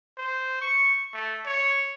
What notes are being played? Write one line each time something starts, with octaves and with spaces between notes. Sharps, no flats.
C5
C#6
A3
C#5